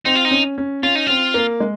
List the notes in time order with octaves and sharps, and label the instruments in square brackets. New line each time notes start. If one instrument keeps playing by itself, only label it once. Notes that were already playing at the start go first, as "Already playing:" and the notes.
[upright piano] C4 [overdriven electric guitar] D#4
[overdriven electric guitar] F4
D#4
[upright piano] C#4
C#4
[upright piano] C#4 [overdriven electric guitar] F4
[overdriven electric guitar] D#4
[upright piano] C4 [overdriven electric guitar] F4
[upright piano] A#3
G#3